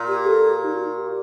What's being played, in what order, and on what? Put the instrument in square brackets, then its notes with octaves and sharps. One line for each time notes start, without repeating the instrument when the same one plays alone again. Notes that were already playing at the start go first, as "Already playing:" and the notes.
Already playing: [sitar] A#2
[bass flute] G4
A4
G4
D#4
F#4
G4